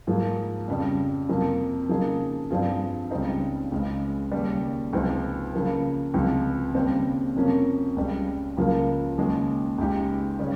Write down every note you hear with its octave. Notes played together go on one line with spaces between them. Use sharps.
G#2 F3 A#3 F4 G#4
F2 C#3 G3
F2 C3 F3 A#3
C#3 F3 A#3 D#4 G#4
G2 F3 C4 F4 G#4
C#2 C#3 G3 C4 D#4
C#2 C#3 G#3
D#2 C#3 G3
C#2 C3 F3 C4 D#4
C#3 F3 A#3
C#2 C3 F3
D#2 C#3 G3 C4
F2 C3 F3 A#3 C#4
C#2 C#3 G3
C#2 C#3 F3 A#3 F4
D#2 C#3 F3 G#3
C#2 C#3 G#3 D#4 G4
C#3 G3 C#4